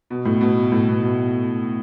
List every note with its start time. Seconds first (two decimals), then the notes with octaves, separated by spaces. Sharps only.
0.10 B2
0.25 A2
0.41 B2
0.72 A2
0.88 B2
1.03 B2